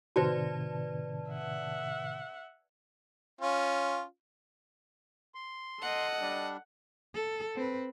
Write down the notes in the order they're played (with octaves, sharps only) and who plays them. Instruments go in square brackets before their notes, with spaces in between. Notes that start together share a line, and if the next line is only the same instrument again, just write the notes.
[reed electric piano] A2 C3 D#3 [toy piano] F#4 C5 [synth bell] B4 D5 A5
[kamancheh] E5 F#5
[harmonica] C#4 F4
[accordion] C6
[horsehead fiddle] A4 D#5 [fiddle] F#5
[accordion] G3 D4
[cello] A4
C4 B4